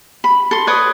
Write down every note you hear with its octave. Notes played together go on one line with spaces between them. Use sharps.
B5
A4 C6
B4 C#5 D5 D#6